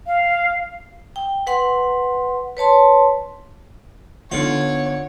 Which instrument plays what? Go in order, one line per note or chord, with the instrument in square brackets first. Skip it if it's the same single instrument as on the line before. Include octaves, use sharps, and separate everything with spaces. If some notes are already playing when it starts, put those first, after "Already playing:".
[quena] F5
[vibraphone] G5
B4 F#5 C6
B4 C#5 A5 C6
[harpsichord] D3 F4 [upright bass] D#3 D#4 [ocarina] B3 [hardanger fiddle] C#5